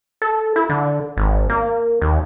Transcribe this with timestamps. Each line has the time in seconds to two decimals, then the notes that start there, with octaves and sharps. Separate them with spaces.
0.22 A4
0.56 E4
0.70 D3
1.17 G#1
1.50 A#3
2.02 D#2